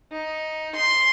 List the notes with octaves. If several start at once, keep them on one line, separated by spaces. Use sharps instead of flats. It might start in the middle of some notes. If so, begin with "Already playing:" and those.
D#4
C6